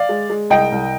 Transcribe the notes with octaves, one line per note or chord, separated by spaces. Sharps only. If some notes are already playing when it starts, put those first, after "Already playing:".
Already playing: D5 F5
G#3
G#3
C2 D#5 G5
C2